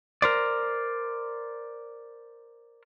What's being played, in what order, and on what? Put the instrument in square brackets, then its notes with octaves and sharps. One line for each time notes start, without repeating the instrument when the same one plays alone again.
[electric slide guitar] A#4 C5 D5